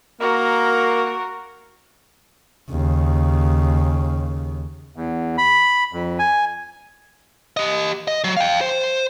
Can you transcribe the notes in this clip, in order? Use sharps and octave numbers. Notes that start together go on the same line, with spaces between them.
A#3 F#4 A#4
D#2 C#3
E2
B5
F2
G#5
G4 D#5
D#5
F#3
F5 G5
C5